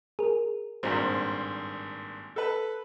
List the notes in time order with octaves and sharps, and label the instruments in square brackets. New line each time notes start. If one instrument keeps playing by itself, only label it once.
[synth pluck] G#4 A#4
[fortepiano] G#1 G2 A#2 [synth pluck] C5
[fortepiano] A4 B4